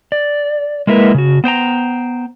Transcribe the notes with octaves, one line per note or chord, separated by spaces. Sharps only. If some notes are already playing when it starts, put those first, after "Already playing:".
D5
G#3 A#3 E4 A#4 B4
C#3 F#4
B3 C5 G5 A#5